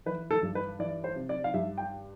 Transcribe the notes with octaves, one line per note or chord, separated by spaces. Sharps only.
E3 B4
A4
G2
B4
E3 D5
C5
C3
D5
F5
G2 E5
G5